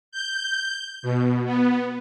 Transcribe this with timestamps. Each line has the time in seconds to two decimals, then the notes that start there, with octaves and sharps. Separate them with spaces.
0.12 G6
1.02 B2
1.45 B3